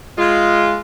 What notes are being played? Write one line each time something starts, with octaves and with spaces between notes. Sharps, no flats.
G#3 F4